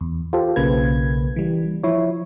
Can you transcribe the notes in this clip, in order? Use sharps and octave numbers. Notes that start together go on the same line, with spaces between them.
E2
F4 G4 A4 C5
B1 C#3 A#3 B4 G#6
E3 G3
F3 E4 C#5